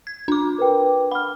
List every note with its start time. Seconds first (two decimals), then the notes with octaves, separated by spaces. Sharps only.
0.07 G#6
0.28 D4 D6
0.59 A#4 B4 G5
1.12 F#5 B5 F6